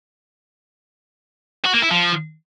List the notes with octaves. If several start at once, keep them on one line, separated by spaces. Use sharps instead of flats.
F#4
A#3
E4
F3